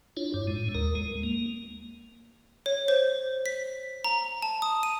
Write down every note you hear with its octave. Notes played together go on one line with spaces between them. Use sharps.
D4 E4 F4 C#5
G2
A2 G#3
D#2 A#4
G#3
A#3
C#5
C5
B6
A#5
A5
D#6
D#7